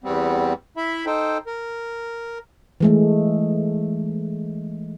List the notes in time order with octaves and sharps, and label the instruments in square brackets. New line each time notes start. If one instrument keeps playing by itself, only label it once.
[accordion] E2 G3 B3 C4
E4 E5 B5
D#4 A4 C5 G5
A#4
[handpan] E3 G#3 A3